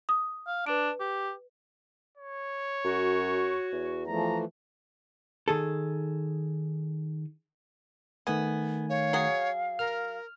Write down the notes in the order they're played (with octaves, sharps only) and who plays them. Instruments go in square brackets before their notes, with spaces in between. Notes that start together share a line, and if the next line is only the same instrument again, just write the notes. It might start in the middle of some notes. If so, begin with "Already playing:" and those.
[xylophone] D#6
[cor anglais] F5
[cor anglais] D4 [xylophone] B4 D7
[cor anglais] G4
[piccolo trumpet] C#5
[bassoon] F#2 [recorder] F#4
[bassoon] E2
[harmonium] E3 F3 A3 [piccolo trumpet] A#5
[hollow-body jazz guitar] D#3 G#4 A4
[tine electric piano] D#3 A3 G#5 [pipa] B3
[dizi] C#5 [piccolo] F5
[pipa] F#3 G#4
[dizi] A#4 [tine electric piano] F6